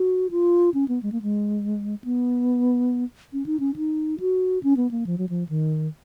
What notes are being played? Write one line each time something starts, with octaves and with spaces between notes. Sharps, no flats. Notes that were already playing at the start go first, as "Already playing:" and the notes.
Already playing: F#4
F4
C#4
B3
G#3
A#3
G#3
B3
C#4
D#4
C#4
D#4
F#4
C#4
B3
A#3
F3
F#3
F3
D#3